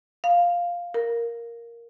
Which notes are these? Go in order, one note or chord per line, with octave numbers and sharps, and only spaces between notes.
F5
A#4